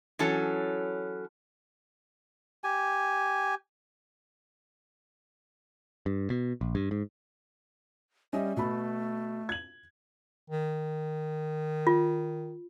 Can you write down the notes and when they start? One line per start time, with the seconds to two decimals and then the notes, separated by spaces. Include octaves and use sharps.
0.19 E3 F#3 C#4 A4
2.64 G4 G#5
6.06 G2
6.30 B2
6.61 A#1
6.75 G2
6.91 G#2
8.33 G3 C#4 D#5 E5
8.57 B2 A3 B5
9.49 G#6 F#7
10.50 D#3
11.87 F4